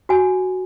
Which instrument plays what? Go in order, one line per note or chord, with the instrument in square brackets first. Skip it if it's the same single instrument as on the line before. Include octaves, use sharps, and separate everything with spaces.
[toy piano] F#4 G#5